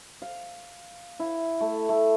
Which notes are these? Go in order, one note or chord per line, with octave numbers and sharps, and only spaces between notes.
F5
E4
A3
A3